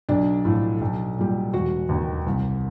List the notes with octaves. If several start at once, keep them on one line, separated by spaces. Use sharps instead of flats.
B1 D4
A2 F3
B1
A#2 G3
E1 F#4
D#2 D#3
C2